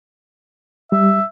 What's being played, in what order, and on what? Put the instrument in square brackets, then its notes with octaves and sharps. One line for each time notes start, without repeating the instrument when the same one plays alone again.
[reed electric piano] G3 [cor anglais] E5